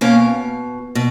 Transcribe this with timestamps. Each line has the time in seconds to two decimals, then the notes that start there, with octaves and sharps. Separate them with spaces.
0.01 B2 A#3 C#4
0.95 B2